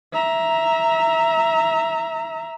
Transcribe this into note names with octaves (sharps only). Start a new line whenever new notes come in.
E5 A#5